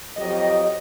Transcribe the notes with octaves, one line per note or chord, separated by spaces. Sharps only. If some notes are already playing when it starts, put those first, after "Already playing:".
F2 F#3 G4 D#5